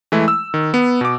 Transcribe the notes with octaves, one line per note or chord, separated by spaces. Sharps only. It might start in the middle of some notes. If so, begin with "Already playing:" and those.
E3 G#3 A3 E4
E6
D#3
B3
B2 D6